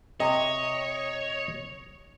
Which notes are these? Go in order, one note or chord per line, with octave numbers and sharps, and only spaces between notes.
C3 C#5 D#5